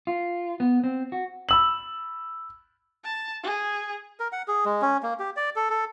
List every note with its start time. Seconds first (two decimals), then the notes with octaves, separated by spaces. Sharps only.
0.07 F4
0.60 B3
0.84 C4
1.12 F#4
1.49 B5 E6 F#7
3.04 A5
3.43 G#4
4.20 A#4
4.32 F#5
4.48 G#4
4.65 G#3
4.82 C#4
5.03 A#3
5.19 G4
5.37 D5
5.56 A4
5.70 A4